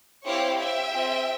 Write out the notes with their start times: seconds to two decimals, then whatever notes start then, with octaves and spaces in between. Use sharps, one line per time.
0.26 C4 E4 G4 C#5 F5
0.59 E5 G5
0.91 C4 F4 G#4